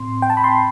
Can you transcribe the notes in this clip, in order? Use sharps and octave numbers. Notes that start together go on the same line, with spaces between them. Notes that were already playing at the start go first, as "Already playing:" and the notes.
Already playing: A2 C4 C6
G5
A5
B5
C6